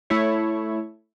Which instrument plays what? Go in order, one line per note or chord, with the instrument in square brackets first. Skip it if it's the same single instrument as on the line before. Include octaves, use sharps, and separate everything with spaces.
[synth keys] A3 E4 C#5